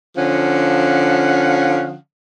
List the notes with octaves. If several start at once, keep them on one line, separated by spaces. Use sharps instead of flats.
D3 F3 C#4 F5 F#5